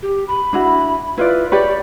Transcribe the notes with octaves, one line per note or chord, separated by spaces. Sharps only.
G4
B5
D4 E4 F#4
E4 F4 B4 D5
G4 B4 C#5 D5